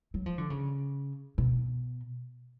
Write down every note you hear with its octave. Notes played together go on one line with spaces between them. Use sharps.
F#3
F3
D3
C#3
B2